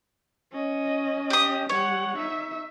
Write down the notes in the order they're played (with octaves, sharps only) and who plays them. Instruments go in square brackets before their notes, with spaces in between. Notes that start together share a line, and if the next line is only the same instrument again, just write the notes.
[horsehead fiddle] C#4 D#5
[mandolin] G4 D#6
[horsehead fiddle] G3 F#5 [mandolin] C#5
[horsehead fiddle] D#4 E5